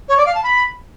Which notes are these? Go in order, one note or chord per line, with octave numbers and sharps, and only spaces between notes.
C#5
D5
F5
A5
B5